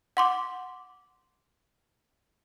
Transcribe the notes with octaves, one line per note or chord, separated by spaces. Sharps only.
F#5 C6 D6